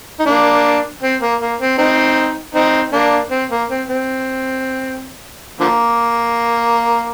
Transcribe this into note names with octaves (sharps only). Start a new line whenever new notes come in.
D#4
A#3 D4
C4
A#3
A#3
C4
C4 D#4
C4 D#4
A#3 D4
C4
A#3
C4
C4
D3 F3 A#3